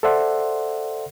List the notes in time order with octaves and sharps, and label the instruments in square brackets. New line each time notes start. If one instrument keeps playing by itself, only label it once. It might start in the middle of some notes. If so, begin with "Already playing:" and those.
[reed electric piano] A4 C5 D5 E5 F#5 C6